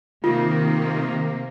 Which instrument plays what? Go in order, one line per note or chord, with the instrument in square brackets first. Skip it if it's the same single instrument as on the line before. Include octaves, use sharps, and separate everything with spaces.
[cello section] C3 A#3 [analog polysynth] D#3 [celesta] F4